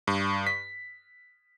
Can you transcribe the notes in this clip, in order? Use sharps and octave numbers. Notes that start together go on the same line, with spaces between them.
G2
B6